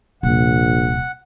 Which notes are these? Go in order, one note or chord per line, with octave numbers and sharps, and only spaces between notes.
D#1 A#1 C3 F#5